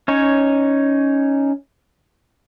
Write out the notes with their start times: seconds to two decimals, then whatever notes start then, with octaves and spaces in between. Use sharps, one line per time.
0.08 C#4 D#4 C#5